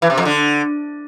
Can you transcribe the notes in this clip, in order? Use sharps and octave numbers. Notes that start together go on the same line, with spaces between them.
E3
C3
F2
D3